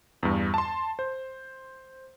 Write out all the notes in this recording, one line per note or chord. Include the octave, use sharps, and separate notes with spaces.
E2 G2
A5 C6
C5